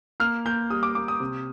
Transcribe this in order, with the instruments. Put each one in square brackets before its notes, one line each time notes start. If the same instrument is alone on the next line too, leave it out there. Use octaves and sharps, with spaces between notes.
[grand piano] A#3 F6
A#3 G6
G3 D#6
D6
A#3 D6
D#6
C3